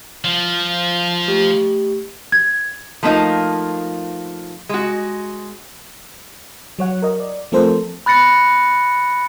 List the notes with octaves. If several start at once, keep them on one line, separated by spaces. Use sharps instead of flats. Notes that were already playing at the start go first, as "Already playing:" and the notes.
F3
A3 G4
G#6
F3 A3 A#3 D#4 F4
G#3 F#4
F#3 C#5 F#5
A#4 D#5
D5
F3 A3 C4 A4 A#4 C5
B5 F#6 A6 A#6 C#7